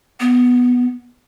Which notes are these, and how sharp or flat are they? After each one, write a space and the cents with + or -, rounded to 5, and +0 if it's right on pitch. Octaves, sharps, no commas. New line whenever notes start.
B3 +0